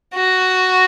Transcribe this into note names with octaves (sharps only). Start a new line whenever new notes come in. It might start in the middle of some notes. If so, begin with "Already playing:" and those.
F#4